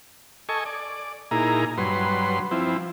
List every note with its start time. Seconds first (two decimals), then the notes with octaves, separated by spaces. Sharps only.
0.49 A4 D#5 G#5 C#6
0.65 D5
1.31 A#2 D#4 E4 G#4 A#5
1.78 G2 F#3 B4 C6
2.51 F3 C4 E4